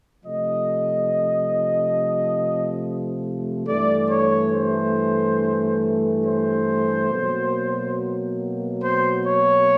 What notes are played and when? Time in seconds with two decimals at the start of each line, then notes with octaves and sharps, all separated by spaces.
0.24 C3 F3 A3 D#5
3.67 G2 E3 A3 D5
4.10 C#5
4.53 C5
6.25 C5
7.10 B2 F#3 A#3
8.82 C5
9.25 C#5